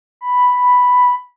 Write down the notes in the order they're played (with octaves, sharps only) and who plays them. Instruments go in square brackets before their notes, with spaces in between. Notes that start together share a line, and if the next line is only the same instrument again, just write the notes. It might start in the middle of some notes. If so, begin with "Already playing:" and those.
[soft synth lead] B5